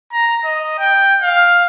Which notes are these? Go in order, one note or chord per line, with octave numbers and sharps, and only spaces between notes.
A#5
D#5
G5
F5